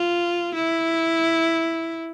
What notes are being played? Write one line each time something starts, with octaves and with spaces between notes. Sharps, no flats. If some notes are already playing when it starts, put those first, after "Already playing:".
Already playing: F4
E4